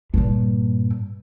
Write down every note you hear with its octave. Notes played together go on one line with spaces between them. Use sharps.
G2 A#2